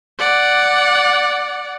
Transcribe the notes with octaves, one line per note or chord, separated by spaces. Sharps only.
D5 F#5